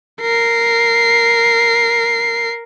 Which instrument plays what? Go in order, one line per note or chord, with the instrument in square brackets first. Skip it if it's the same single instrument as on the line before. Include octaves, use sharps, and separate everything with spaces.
[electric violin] A#4 C7